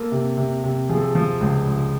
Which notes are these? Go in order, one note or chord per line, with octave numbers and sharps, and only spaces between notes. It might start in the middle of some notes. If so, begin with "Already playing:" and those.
Already playing: A#3 A4
C3
C3
C3
F3 G#4
A4
G#4
F3
C#2
C#2